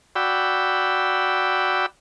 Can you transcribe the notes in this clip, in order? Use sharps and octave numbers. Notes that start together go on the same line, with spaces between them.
F#4 D5 G5 B5 E6